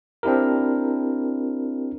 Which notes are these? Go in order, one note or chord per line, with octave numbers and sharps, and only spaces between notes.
C4 D4 E4 G4 A#4